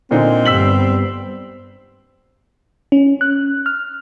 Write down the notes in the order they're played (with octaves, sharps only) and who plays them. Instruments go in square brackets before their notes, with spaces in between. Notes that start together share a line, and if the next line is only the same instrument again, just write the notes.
[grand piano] A#2 D3 D#4 [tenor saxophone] C4
[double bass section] G2 G3 B3 [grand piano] E6 B6 F#7
[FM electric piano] C#4
F#6
F6